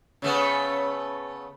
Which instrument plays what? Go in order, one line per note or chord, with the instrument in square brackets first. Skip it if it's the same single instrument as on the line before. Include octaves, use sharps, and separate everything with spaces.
[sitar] C#3 A3 B3